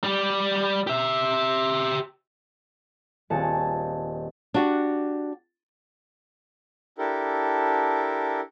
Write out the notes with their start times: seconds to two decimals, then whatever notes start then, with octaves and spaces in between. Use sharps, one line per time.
0.04 G3 G4
0.87 G4 E5
3.30 D#1 C4 G#4 A5 C#7
4.54 D4 F#4 G4
6.98 D4 E4 G4 A4 A#4